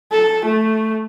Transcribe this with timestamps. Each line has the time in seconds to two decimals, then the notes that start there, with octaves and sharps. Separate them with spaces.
0.12 A4
0.45 A3